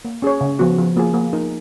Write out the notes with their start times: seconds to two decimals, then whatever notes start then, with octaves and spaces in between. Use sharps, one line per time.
0.05 A#3
0.22 C#4 G#4 C#5
0.41 C#3
0.59 F3 B3 F#4
0.78 F3
0.97 A#3 F4 G#4
1.14 A#3
1.33 D#4 A#4